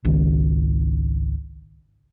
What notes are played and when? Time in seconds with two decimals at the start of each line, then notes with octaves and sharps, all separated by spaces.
0.05 G#1 C#2 D#3